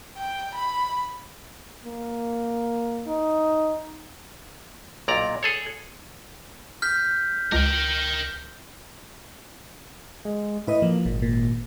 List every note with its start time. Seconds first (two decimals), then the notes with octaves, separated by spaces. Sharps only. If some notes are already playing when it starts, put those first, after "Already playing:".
0.17 G5
0.55 B5
1.85 A#3
3.07 D#4
5.08 B1 A#2 D5 A#5
5.43 G#4 A4 C#5
6.82 F6 G6 B6
7.52 C#2 A#4 G5
10.25 G#3
10.67 A2 E4 B4 D#5
10.82 F3 A#3
11.05 G#1 A#2
11.22 A#2